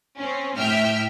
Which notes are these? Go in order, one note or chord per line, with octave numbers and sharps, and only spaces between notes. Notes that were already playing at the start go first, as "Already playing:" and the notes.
C4 C#4
A2 E5 G5 F6